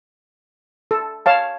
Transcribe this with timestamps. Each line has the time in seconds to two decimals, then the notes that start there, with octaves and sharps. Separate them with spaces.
0.91 A4
1.26 C#5 F5 A5